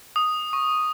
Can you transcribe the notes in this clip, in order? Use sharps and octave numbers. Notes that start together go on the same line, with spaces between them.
D#6
C#6